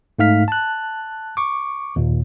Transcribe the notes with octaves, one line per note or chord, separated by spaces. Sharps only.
G#2 A3 D#4 F5 F6 B6
A5 F#6
C#6 D6
D#2 A#2